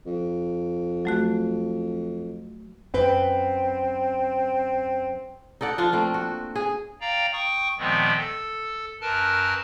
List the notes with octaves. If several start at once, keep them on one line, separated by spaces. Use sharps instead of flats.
F2
F#3 A3 F#4
F#2 C4 B4 G5
D#4 A4 D5 F#5
F3 D4 F4
A3 A#3 C4
F#4
G#4
D5 F5 G5 A#5
G5 C#6 D#6
A#2 D#3 F3 G#3 B3 C4
A4
F#2 A#4 B4 A5 F6